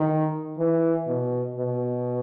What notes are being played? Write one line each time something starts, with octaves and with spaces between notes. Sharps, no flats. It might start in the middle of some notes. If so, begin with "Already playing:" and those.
Already playing: D#3
E3
B2
B2